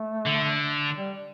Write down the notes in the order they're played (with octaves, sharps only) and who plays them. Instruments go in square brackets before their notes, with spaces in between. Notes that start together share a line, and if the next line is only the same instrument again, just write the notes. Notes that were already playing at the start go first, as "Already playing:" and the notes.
Already playing: [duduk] A3
[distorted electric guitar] D3
[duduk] G3